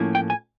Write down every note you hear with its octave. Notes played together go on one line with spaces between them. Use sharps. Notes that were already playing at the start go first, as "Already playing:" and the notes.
Already playing: A2 F3 A#3 C#4 E4
G5
G#5